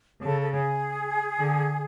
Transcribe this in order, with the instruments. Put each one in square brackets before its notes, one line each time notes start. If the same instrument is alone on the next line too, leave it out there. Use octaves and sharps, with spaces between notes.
[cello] C#3 [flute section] A4
[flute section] A4
G#4
[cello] D3